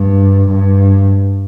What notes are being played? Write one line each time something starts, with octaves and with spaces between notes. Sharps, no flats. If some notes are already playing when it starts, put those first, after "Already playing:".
Already playing: G2
G2